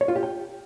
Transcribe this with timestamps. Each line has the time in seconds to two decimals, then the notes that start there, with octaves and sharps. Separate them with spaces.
0.01 C#5
0.08 F4
0.16 G4
0.23 G5